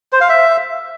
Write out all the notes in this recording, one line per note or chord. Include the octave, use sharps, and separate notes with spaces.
C5
F5
E5